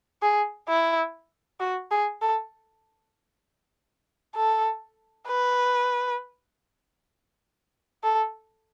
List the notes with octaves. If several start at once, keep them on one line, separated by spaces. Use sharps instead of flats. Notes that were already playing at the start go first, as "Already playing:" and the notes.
G#4
E4
F#4
G#4
A4
A4
B4
A4